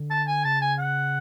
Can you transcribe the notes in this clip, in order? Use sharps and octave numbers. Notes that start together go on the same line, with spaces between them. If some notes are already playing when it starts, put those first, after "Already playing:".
Already playing: D3
A5
G#5
C#3 A5
G#5
F#5